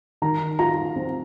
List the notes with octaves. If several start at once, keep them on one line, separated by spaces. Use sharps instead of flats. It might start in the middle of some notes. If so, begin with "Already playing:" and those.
D#3 A#5
F4 A#5
C4